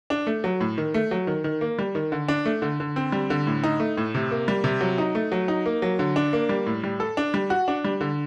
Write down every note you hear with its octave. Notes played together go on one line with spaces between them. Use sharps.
D4
A3
F#3
A2
D#3
A3
F#3
D#3
D#3
A#3
G3
D#3
D3
D4
A3
D3
D3
C4
G3
D3
A2
D#4
A3
A2
C3
A#3
G3
C3
F#3
D#4
A3
F#3
D#4
A#3
F#3
D3
D4
A#3
G3
A2
G3
A4
D4
G3
F#4
D4
G3
D3